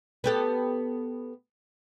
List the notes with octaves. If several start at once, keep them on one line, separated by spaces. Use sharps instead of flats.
B3 G4 A4